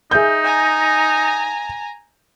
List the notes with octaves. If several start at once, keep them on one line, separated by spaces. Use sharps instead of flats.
D#4 G#4 E5 G6
G#5 A#5